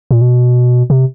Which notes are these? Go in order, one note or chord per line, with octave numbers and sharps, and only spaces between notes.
A#2
B2
C3